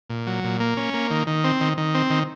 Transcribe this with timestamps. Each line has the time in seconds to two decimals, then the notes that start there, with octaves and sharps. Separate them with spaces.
0.10 A#2
0.27 F#3
0.44 A#2
0.60 A#3
0.77 C#4
0.94 A#3
1.11 D#3
1.27 D#3
1.44 C4
1.61 D#3
1.78 D#3
1.95 C4
2.10 D#3